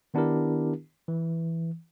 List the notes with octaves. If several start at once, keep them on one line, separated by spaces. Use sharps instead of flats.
D#3 B3 D4 E4 G4 A#4
E3